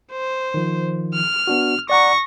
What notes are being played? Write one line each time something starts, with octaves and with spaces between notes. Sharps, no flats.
C5
D#3 F3
F6
B3 D4 F#4
D5 F#5 A#5 C#6 A#6